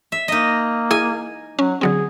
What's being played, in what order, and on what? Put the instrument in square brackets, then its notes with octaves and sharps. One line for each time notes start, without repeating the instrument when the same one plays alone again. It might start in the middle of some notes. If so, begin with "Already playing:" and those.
[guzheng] E5
[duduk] A#3 [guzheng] D#4 D#5
[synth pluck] E4 G#4 D#6 [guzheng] G#5
[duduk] F#3 [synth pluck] C#4
[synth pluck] D3 F#3 C4 [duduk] G#4